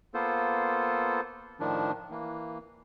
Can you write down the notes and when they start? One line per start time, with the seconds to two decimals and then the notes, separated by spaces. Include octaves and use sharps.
0.14 A#3 B3 F4 A4 C5
1.60 A2 D#3 F3 D4
2.11 E3 A#3